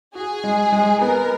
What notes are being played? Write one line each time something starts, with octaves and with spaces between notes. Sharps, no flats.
F#4 G#4
G#3
G#3
B3 A#4